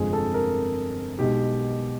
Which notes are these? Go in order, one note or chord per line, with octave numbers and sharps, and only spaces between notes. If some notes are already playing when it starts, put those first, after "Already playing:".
Already playing: G1 F2 C3 F3 G#3 G#4
A4
A#4
B1 B2 G#3 B3 G4